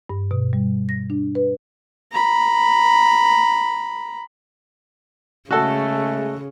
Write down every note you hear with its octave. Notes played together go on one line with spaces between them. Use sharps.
G2
B2
G3
A#6
D4
B4
A#5 B5
C#3 G#3 A3 F#4 G#4 A4